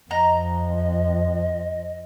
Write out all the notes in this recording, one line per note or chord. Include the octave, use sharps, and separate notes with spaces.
F2 D#5 A#5